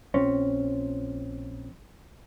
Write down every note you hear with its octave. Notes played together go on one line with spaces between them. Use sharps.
A#1 C4 C#4